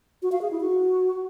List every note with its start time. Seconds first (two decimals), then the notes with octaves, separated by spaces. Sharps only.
0.22 F#4
0.32 F5
0.42 G#4
0.51 E4
0.61 F#4